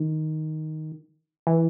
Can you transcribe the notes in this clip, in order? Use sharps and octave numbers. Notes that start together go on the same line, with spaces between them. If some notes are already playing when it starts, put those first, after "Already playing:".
Already playing: D#3
E3